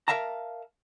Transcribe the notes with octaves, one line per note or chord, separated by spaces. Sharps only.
A#4 C5 E5 F5 A5 A#5